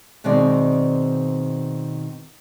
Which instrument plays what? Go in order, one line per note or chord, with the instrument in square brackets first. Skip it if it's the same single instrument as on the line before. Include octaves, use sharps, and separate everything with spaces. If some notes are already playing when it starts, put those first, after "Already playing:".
[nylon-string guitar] B2 D#3 G#3 C4 D5